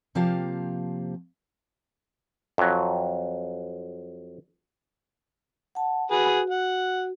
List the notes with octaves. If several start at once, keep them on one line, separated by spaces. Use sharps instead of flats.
C3 F3 A#3 G4 F5 A5
F2 F#3
F#5 A5
F#4 G#4 B4 F#5
F#5